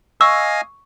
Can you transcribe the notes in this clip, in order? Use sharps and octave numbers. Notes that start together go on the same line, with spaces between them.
D#5 F5 G#5 C#6 E6